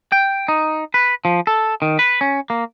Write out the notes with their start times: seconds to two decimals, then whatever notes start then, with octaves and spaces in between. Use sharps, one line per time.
0.12 G5
0.48 D#4
0.94 B4
1.25 F3
1.47 A4
1.82 D#3
1.99 B4
2.21 C#4
2.50 A#3